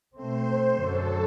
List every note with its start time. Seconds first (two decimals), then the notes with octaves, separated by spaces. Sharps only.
0.16 B2 A3 C4 C5
0.79 F#2 D3 F#3 A4